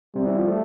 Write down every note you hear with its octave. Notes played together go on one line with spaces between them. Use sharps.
C3 G3
E3
F3
A3